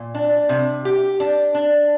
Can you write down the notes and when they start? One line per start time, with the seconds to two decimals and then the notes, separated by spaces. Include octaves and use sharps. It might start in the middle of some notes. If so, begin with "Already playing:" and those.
Already playing: A#2
0.15 D4
0.49 C3
0.85 G4
1.20 D4
1.55 D4